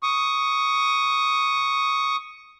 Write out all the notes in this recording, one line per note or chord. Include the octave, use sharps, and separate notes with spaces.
C#6 D#6